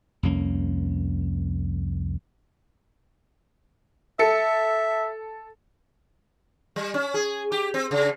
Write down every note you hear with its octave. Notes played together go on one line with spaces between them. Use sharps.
C2 F2 A#3 C#4
A4 E5 C#7
G3
C#4
G#4
G4
C4
C#3